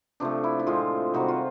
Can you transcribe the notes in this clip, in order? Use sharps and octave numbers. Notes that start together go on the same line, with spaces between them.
C3 F3 A3 D4
E4
E4
A2 F3 G#3 C4 F4
C3 D#3 G3 C4 F#4
F4